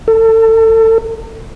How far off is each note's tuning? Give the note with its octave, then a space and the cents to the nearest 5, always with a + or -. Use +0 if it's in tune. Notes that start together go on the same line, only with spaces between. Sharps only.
A4 +30